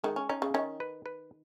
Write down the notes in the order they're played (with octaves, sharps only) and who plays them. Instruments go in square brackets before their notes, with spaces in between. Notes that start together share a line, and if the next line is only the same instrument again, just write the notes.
[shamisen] D#3 [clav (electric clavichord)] G#3
[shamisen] C#4
[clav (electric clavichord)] C#4 [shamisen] D#4
[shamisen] C#3
[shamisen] D#3 [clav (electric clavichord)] C#4
[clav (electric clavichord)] B4
B4